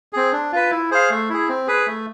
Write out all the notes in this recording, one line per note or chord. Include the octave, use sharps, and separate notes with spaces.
C4 G#4
D4
F4 B4
E4
G#4 C5 F5
A3
E4 G#4
C4
G#4 B4
A3